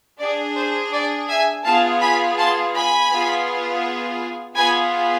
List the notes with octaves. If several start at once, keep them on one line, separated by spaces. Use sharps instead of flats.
D4 G#4 D5
C5
D5
E5 G#5
B3 F4 G#4 F5 A5
G#5 B5
A5 C6
G#5 B5
B3 F4 G#4
B3 F4 G#4 G#5 B5